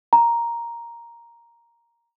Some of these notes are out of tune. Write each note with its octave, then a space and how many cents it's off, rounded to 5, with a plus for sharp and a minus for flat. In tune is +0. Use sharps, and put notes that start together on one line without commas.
A#5 +5